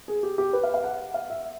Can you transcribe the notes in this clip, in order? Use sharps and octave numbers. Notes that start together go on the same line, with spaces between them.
G#4
G4
G4
B4
F5
F5
F#5
F5
E5